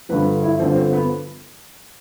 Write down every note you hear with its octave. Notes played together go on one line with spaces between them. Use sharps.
G2 D3 F3 B4
E4
G2 D3 F3 C4
C4
B3